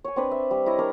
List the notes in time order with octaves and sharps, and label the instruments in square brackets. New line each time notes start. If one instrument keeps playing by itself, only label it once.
[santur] C#5 G#5
C4 D4 B4
E5
G3
E4 C#5 D#5 A#5
D4 A#4 C#5